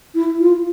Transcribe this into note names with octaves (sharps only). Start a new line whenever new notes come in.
E4
F4